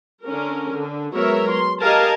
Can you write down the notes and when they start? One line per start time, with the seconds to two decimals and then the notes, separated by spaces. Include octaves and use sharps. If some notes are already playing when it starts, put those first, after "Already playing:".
0.24 D3 C#4 A#4
0.73 D3
1.13 F#3 G#3 B3 A#4 C#5 E5
1.50 C6
1.83 G4 A#4 D#5 F5 G#5 A5